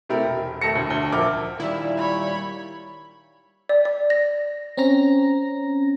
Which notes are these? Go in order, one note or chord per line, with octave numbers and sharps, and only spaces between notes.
C3 A3 E4 G4 A#4
E1
D#2 A3 E5 A5 A#6 C#7
E1 D2
D2 G7
D#1 F3 A#4 E5 D6 F6
A#2 D#3 G3 E4
C#5 B5
D5
D5
A#6
C4 C#4 A#5 A#6